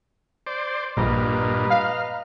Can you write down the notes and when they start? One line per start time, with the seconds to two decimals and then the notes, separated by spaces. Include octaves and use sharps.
0.47 C5 D5
0.97 A#1 G2 A#2 B4 D#5 A#5
1.70 F5 F6